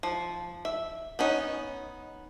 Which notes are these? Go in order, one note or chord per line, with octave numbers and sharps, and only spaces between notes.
F3
E5
B3 C#4 D#4